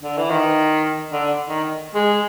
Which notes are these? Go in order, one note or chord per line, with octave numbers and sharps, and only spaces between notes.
D3
E3
D#3
D3
D#3
G#3